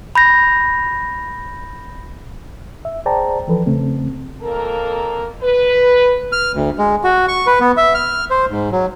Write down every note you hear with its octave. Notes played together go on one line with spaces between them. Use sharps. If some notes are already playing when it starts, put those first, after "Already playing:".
B5 G6 A#6
E5
G#4 C5 D5 G5 A5 A#5
E3 F3 A4 B4
E2 C#3 A3 C4
F2 A#3 A4 A#4
B4
F6
D2
G#3
F#4
C#6
B4
B3
E5
F6
C5
G#2
F#3